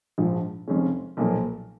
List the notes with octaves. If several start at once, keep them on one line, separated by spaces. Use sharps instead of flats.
A#1 G#2 F3
F1 F2 C#3 G#3 C#4
B1 A#2 F3 A#3